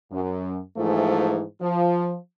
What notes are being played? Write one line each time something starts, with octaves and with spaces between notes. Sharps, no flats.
F#2
G#2 E3 F3 A3
F3